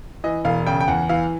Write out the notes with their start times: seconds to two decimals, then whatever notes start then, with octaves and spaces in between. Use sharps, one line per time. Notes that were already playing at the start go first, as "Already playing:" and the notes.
0.24 E3 D#5
0.45 E1 F5
0.67 C#3 G5
0.80 G5
0.88 E2 F#5
1.09 E3 F5